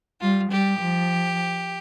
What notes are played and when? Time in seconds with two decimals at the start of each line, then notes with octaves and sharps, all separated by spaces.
0.21 G3 F4
0.49 G3 G4
0.79 F3